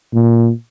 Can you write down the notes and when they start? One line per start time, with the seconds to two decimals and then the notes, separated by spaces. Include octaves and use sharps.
0.14 A#2